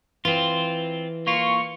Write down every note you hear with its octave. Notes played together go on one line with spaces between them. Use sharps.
E3 C4 F4
A#3 F4 C#6